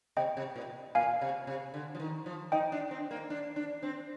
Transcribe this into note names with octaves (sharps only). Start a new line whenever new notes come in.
C3 D#5 G5
C3
A#2
A#2 F5 G#5
C3
C3
D3
F3
D#3
F3
D#4 D#5 G5
D4
C4
A#3
D4
D4
C4